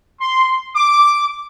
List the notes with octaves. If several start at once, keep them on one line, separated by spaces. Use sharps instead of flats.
C6
D6